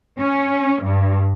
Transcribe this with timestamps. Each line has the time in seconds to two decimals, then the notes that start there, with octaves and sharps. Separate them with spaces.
0.20 C#4
0.82 G2